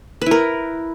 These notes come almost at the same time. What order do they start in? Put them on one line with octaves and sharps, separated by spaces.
B4 E4 A#4